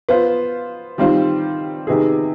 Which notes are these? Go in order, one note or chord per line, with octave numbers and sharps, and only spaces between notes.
B3 F4 C5
D#3 G3 C4 F4 C5
C3 D#3 B3 D#4 G#4